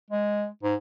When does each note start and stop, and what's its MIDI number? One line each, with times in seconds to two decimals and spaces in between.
0.10 0.47 56
0.63 0.75 44